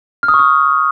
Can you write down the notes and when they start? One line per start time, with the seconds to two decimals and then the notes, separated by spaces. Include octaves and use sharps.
0.23 F6
0.28 D#6
0.34 C#6
0.39 D#6